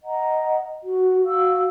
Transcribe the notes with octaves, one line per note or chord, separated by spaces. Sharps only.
D#5 F#5 A#5
F#4
F#4 F5 E6